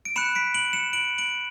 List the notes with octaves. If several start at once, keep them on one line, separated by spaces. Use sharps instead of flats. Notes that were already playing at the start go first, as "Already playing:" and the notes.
D7
B5 F#6 C#7 E7
B6 D7
D7 F#7
C#7 E7
D7 F#7
D7 F#7